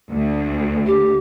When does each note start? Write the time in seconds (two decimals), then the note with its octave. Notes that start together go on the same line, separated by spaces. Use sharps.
0.10 D2
0.86 G4